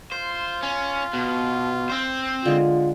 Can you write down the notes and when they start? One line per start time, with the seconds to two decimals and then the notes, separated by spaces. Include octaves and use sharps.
0.12 F4 C5
0.63 C#4
1.13 B2
1.90 C4 C5
2.46 D3 G#3 F4